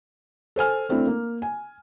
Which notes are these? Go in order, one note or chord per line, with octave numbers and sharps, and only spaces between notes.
A4 C5 G#5 F6
A3 C4 D4 E4
A#3
G#5